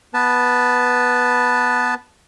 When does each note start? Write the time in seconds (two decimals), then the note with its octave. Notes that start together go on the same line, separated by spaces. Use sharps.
0.14 B3 B4 A5